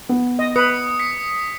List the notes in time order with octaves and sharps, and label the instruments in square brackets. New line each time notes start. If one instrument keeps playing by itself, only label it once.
[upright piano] B3
[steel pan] D#5
[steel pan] B4 [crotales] D#6 C#7
[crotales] B6 C#7